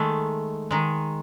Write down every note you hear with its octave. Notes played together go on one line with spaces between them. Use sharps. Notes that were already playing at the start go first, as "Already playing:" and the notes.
Already playing: D#3 G#3 A3
D#3 G#3